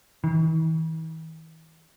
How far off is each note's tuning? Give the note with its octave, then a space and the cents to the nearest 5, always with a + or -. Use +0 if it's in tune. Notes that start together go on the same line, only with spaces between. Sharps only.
E3 -45